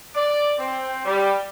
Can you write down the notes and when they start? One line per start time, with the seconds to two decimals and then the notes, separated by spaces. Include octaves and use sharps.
0.15 D5
0.59 C4
1.05 G3